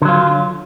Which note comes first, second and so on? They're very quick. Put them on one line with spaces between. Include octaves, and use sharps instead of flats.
D3 F#3 F4